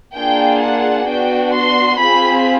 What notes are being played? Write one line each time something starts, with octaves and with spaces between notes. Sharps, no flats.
A#3 D4 F4 G#4 G5
F#5
B3 D4 F#4 G5
C6
C4 F4 G#4 B5